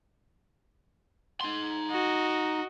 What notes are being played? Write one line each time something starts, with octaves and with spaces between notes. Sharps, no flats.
D#4 C6
F#4 D#5